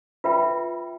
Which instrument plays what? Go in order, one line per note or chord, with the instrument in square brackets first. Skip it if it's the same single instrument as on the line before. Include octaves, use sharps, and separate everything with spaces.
[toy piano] F4 B4 E5 G5 B5